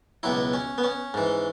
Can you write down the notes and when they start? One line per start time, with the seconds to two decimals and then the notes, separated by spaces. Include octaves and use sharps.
0.23 C#2 B2 F#3 E4
0.53 C#4
0.78 B3
0.84 C#4
1.14 G#2 E3